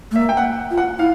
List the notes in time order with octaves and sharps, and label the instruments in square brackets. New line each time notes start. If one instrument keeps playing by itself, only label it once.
[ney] A3
[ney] A#3 [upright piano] E5
[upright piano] G5
F#5
[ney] F4
[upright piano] F#5
[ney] E4 [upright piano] F5